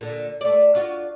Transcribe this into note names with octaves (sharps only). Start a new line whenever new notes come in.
A#2 D3
A3 D5
D4 F4 F#4